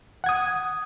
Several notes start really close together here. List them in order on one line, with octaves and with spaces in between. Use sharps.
F#5 G#6 D#6